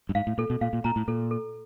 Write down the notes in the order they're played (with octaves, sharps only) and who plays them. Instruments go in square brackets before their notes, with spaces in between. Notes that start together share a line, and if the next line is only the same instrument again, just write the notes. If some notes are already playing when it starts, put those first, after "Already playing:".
[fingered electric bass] G2
[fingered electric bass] G#2 [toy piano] F5
[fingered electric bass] A2
[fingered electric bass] A#2 [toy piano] A4
[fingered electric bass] B2
[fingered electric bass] A#2 [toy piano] F5
[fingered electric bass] A#2
[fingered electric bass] A#2 [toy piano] A#5
[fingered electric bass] A2
[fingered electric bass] A#2 [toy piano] A4
[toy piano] A4